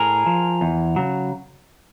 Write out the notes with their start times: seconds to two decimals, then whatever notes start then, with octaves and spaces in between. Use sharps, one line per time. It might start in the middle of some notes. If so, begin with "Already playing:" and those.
Already playing: A2 G#4 A#4
0.26 F3
0.61 E2
0.96 C#3 F#3